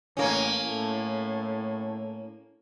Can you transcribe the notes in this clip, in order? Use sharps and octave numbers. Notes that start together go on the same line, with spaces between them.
A1 A#3 C#4
A2